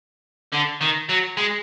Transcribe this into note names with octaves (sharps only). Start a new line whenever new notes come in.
D3
D#3
F#3
G#3